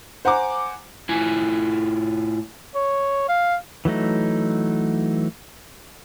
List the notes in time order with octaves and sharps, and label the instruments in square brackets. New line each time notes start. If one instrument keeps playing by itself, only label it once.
[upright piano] C5 F#5 G#5 A#5 D6
[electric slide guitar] A2 E4 F4 G#5
[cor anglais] C#5
F5
[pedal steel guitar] E3 F#3 A3 D#4